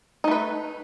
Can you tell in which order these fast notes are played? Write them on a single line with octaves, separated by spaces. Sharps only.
D#4 A3 B4